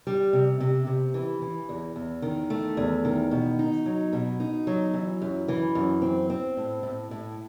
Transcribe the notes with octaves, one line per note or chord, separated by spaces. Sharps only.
G3
C3
C3
C3
E3
E3
E2
E2
D#3
A3
E2
D#3
B2
D#4
F#3
B2
D#4
F#3
E3
F#2
E3
F#2
C4
C4
A2
A2
A2